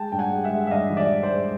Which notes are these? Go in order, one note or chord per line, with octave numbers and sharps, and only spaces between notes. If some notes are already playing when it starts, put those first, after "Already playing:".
Already playing: G#3 G5 A5
G2 G5
F#5 G#5
G#3
E5 F#5
G#3
E5
G2 D#5 F5
E3
D5 E5
E3
C5 D5
G#3